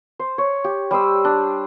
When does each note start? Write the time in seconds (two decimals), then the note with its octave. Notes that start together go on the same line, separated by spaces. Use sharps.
0.19 C5
0.38 C#5
0.64 G4
0.91 G3 G4 C5 E6
1.25 D4